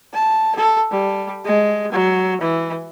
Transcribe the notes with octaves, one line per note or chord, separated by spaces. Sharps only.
A5
A4
G3
G#3
F#3
E3